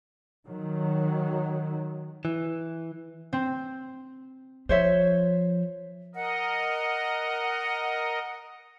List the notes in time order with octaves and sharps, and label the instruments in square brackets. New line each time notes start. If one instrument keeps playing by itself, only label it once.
[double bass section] D#3 F#3
[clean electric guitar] E3
[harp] C4
[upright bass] F3 [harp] C5 C#5 E5
[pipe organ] A#4 D#5 [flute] F#5